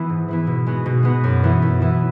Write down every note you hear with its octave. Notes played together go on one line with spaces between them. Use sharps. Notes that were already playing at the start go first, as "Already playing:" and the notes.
Already playing: E3 B3 E4
G#2
E3 B3 E4
B2
G#3 B3 F#4
B2
G#3 B3 F#4
F#2
E3 B3 E4
F#2
E3 B3 E4